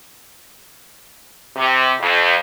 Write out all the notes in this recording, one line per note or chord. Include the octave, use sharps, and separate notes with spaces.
C3
F2